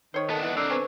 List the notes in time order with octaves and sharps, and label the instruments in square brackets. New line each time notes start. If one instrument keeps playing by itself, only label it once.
[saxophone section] D#3 [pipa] C5 C#5
[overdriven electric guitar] B3 D4 [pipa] A4 [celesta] D#5
[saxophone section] E3 [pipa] F#5
[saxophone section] D3 D4 [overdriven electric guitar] C4 A#4 [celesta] E6 F#6 C7
[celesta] B4 C5 C#6 [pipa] G#5